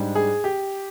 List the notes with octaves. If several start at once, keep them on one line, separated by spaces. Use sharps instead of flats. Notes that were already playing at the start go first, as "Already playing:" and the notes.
Already playing: G#2 G3 D4
G#4
G4